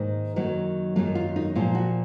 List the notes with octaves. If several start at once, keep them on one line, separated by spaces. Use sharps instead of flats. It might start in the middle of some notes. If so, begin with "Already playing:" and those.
Already playing: G#2 D#3 A#3 D#4
F#2 D#3 F#3 A#3
F#2 D#3 F#3 A#3 F4
F4
D#4
A#2 F3 A#3 F4
F#4